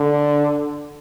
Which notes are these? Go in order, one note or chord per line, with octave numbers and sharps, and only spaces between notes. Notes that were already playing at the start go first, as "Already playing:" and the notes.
Already playing: D3